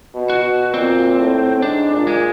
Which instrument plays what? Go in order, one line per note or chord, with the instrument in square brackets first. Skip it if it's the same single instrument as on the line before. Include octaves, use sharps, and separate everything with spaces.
[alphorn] B2
[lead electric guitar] F#4
[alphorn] B2
[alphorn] A#2 [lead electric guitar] C4
[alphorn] A2
[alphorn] G#2 [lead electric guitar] D4
[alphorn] A#2
[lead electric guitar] G#3